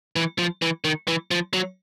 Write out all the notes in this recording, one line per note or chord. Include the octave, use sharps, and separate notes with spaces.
E3
F3
E3
D#3
E3
F3
F#3